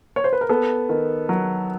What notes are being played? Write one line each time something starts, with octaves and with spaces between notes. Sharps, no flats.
C#5
C5
B4
A#4
B3 A4
D#3
F#3